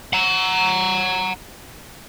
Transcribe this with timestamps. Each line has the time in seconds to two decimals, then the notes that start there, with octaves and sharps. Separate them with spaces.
0.13 F#5 A#5